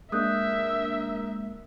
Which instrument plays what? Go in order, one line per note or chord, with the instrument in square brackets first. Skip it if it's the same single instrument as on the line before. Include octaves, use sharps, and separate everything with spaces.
[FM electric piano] G#3 A#3 D4 [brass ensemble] A#4 [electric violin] E5 [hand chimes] D#6 F#6 G6